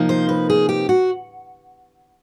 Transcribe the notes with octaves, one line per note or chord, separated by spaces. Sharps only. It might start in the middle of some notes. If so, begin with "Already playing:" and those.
Already playing: C3 F3 A#3 D#4
C5
B4
G#4
G4
F#4